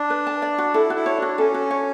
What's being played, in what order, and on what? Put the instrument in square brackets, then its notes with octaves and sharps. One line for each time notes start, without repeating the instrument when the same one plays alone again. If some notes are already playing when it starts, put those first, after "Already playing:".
Already playing: [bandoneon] D4
[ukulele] B4
A5
D5
F#4
[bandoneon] E4 [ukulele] A4
[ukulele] F#4
[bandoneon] E4
[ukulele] C#5
[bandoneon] D4
[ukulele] F#4
[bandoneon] C#4 [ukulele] A4
[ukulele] F#4
C#5